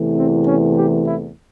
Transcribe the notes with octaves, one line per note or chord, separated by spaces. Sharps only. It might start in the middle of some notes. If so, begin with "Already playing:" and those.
Already playing: E2 C3 E3 A3
C4
C#4
G4
E4